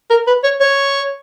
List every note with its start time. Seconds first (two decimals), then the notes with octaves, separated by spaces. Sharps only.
0.10 A#4
0.27 B4
0.44 C#5
0.61 C#5